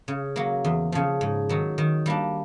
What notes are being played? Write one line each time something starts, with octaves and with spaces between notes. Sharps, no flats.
C#3
F#3 A#3
E2
C#3 F3
G#2
D#3 F#3
D#3
G3 A#3 D4